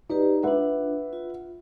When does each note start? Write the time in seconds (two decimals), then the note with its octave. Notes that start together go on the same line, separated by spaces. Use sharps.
0.09 D#4 G4 B4 D5
0.43 D4 F4 B4 E5 F#5
1.13 F4